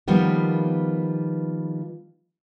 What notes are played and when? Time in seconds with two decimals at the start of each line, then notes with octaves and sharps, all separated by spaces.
0.08 D#3 F3 G3 A#3 B3 F4